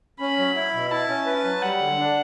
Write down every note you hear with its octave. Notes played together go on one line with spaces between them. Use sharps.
C#4 B5
F#3
E4
B2
E4 A5
C#4
B4
F#3
G3 F#5
D3
D4